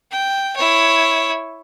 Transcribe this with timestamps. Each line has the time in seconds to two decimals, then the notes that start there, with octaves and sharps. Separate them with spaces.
0.12 G5
0.56 E4 C#5